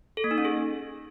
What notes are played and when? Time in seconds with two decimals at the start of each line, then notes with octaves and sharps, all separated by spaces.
0.17 A4
0.24 A#3
0.31 D#4
0.38 C#4
0.45 G#4